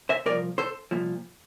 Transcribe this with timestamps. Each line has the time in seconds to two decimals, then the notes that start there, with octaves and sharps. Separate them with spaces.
0.09 C5 E5
0.26 C2 A#2 F3 A#4 D5
0.58 A4 C5
0.91 C2 A#2 F3